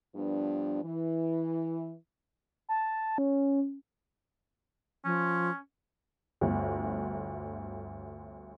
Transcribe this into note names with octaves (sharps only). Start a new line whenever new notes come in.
G2 F3 B3 D4
E3
A5
C#4
F3 C#4
G1 D2